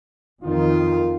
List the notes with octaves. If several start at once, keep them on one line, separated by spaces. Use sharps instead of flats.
F2 D#3 F4